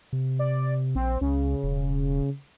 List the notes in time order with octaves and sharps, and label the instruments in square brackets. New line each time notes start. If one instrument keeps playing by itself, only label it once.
[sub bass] C3
[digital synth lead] D5
[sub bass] A#1 [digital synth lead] C4
[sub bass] C#2 [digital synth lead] C#3
[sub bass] E1